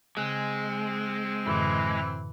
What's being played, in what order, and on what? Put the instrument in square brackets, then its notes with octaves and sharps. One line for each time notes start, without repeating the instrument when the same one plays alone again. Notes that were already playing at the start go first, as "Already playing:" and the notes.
[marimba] C#3 G#5 F#6 [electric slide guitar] G#3 [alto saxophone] C4
[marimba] F#2 A2 D3 [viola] E3